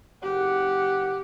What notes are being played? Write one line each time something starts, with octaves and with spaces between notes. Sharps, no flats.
F#1 G4 F#5